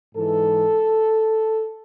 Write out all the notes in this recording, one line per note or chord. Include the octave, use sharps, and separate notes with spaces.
G#2 E3 A4